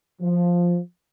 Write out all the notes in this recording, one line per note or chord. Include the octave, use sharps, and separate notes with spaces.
F3